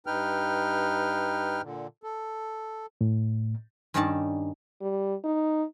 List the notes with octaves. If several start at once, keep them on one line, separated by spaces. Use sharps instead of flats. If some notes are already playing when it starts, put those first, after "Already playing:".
G2 D#4 B4 G5 F6
A#2 D3
A4
A2
G2 D#3 C#4 D#4 D5 A5
G3
D#4